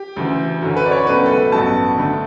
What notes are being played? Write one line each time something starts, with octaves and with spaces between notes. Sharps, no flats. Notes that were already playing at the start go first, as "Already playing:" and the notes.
Already playing: G4
D2 C#3 E3
F#2 D3 F#3 C#4
B4
D5
C#5
C#2 B2 F#3 A3 C#4 B4
A4
B4
A1 G2 F#3 B3 A5
D2 D3 A3